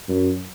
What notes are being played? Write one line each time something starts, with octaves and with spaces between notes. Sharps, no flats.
F#2